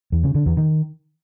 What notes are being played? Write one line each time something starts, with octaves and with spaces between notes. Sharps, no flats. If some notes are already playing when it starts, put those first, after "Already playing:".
E2
C#3
D3
E2
D#3